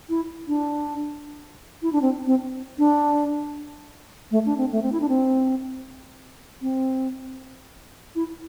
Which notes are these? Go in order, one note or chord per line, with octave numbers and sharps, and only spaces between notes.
E4
D4
E4
D4
C4
C4
D4
A3
D4
C4
A3
C4
E4
D4
C4
C4
E4